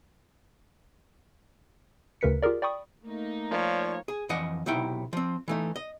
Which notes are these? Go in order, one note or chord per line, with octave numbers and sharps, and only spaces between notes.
D2 C#3 A#4 B4 B6 C#7
F4 G4 G#4 A#4 D5
D5 G5 B5 C#6 D#6
A3 A#3 D#4
F3 C#5 D5 F5
G#4
F2 E3 D#5 F#5
B1 C3 D#4 E4 G5
F3 C4
E3 A3 D#4
D#5